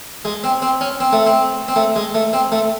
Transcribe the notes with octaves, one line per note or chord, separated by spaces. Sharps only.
G#3
C4
C4
C#4
C4
A3
C4
C4
A3
G#3
A3
C4
A3